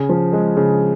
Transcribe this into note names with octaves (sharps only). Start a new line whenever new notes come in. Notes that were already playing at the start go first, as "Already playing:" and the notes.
Already playing: C#3
F3
G#3
C#3